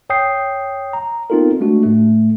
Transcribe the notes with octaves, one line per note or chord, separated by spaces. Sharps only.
F2 C#5 G5 D#6 G6 C7
A#5
B3 C4 D#4 F4 A4 A#4
G#3 A3 D4 F#4
A2 A3